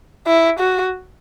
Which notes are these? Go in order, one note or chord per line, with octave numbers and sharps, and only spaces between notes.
E4
F#4